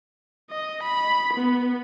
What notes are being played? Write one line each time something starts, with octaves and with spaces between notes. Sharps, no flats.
D#5
B5
B3